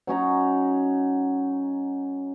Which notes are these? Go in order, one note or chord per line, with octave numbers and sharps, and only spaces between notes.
F#3 C#4 D#4 A#5